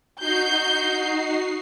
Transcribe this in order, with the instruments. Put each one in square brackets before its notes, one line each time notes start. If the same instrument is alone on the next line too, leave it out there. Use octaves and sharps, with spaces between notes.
[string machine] D#4 F#4 C7 [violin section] G6